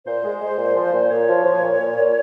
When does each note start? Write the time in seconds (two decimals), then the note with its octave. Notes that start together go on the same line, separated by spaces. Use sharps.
0.06 A#2 C5
0.24 G#3
0.41 G#3
0.58 A#2
0.76 F3
0.93 A#2
1.10 A#2 C#5
1.28 F3
1.44 F3
1.62 A#2
1.79 A#2
1.97 A#2